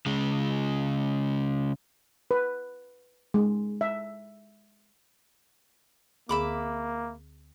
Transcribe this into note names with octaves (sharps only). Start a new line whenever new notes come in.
C#3 G#3
B4
G#3
E5
D2 D3 A#3 G#4 E5 B5 D6